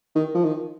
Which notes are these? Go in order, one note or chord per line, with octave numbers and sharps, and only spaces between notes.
D#3
F3
D#3